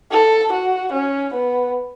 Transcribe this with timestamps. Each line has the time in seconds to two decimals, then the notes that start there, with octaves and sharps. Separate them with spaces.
0.11 A4
0.52 F#4
0.92 C#4
1.33 B3